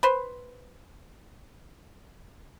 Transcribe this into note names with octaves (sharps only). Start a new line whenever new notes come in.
B4 C5